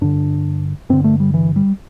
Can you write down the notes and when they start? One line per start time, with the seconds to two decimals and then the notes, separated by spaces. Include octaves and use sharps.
0.01 G2 D3 D4
0.89 G2 D3 C4
1.04 A3
1.20 G3
1.34 E3
1.56 G3